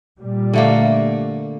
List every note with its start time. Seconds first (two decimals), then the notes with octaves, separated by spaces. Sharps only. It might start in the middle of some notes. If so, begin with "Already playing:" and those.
0.20 A#2 G3
0.53 D3 A3 A#3